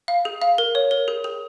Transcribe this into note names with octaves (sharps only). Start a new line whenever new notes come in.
F5
G#4
F5
A#4
C#5
A#4
G#4
G#4